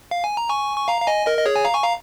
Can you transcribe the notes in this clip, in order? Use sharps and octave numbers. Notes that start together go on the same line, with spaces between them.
F5
G#5
A#5
G#5 C#6
C#6
F5 A#5
F5
D#5 G#5
A#4 D#5
D#5
G#4 C#5
G#5
F5 A#5
G#5 C#6
F5 A#5